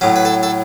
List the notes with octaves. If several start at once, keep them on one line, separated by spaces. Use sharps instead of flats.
A2 F#3 C#4
B4
A4
A4